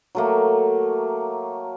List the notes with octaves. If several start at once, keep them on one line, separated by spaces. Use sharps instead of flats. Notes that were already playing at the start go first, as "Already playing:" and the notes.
F#3 A3 A#3